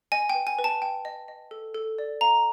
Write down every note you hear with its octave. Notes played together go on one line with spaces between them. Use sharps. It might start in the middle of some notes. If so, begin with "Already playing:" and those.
D#5 G#5
G5
B4
G#5
B4
A5
G5
D#5
D#5
A4
A4
D5
F5 A#5